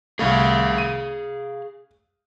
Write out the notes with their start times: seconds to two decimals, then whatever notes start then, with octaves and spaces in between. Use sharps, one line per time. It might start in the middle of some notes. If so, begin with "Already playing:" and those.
0.19 C2 A3 G#4 F5
0.78 D#7